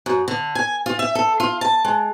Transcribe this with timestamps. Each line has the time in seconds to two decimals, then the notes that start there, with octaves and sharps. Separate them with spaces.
0.06 F#2
0.28 D3
0.55 G#5
0.86 F4
0.99 E5
1.15 A4
1.40 F4
1.61 A5
1.85 G#3